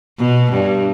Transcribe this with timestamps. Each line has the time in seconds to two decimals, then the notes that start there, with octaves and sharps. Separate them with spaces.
0.18 B2
0.51 G2